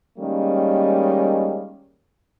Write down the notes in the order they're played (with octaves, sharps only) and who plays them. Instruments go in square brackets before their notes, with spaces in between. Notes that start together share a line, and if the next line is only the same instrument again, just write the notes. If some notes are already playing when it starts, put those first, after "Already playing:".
[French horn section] D#3 G3 G#3 A#3 C#4